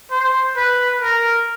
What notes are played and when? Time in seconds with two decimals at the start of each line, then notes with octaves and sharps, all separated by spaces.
0.11 C5
0.57 B4
1.02 A#4